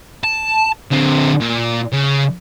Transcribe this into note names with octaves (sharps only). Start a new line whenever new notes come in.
A5
D3 C4
A#2
C#3